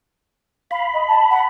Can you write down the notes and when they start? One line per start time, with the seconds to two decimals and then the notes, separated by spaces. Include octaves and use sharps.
0.71 F5 B5
0.94 D#5
1.08 A5
1.30 F#5